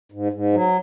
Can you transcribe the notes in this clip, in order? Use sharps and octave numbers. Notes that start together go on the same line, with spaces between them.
G#2
G#2
F#3